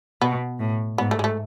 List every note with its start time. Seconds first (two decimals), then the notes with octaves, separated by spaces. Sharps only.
0.22 B2 B3
0.59 A2
0.98 G#2 B3
1.11 A3
1.19 G#3
1.24 A3